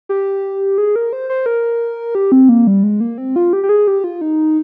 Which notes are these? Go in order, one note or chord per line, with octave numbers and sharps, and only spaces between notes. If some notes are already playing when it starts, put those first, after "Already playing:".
G4
G#4
A#4
C5
C5
A#4
G4
C4
A#3
G3
G#3
A#3
C4
F4
G4
G4
G#4
G4
F4
D#4